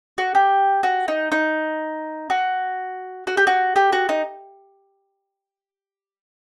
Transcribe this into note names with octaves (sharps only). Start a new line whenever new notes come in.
F#4
G4
F#4
D#4
D#4
F#4
F#4
G4
F#4
G4
F#4
D#4